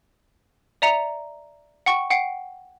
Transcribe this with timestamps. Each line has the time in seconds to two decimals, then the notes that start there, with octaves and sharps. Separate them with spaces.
0.82 D5 E5 A#5 C#7 F7
1.86 F#5 G5 C#6
2.10 F#5 G5 C7